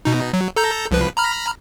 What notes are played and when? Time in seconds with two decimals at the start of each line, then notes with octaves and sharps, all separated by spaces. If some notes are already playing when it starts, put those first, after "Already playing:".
0.05 B2 D#4
0.33 F#3
0.56 A4 A#5 G6
0.91 C2 F3 B4
1.17 A#5 B5 F6